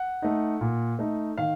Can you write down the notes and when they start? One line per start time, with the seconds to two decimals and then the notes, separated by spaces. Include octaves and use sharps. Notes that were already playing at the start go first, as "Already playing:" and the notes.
Already playing: F#5
0.22 A3 D#4
0.61 A#2
0.99 A3 D#4
1.38 D#3 F5